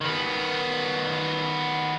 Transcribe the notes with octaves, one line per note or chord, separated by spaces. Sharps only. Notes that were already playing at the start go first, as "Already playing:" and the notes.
D#3 B3